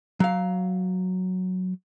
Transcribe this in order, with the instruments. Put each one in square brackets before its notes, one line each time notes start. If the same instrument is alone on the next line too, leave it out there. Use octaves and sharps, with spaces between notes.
[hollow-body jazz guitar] F#3 F5